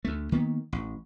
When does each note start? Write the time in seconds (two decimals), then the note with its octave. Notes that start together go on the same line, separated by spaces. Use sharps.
0.05 D2 A3
0.32 D#3 A#3 B3
0.73 A1